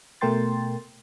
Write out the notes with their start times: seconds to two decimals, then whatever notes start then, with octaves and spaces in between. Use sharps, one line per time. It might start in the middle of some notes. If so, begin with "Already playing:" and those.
0.21 B2 A3 A#4 G5 C6 A6